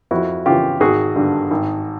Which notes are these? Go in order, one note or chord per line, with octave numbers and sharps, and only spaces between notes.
F2 E4 F#4
C#3 E3 F4 G4
G#1 F#4 G#4
G2 D3
G#1